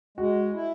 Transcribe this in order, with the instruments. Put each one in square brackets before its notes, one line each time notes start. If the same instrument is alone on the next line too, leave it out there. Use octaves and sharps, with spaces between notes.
[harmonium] G#3 [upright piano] F#4
[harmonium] E4